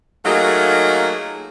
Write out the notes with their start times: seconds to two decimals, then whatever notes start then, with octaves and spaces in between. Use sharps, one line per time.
0.25 F#3 A3 A#3 D#4 F4 G#4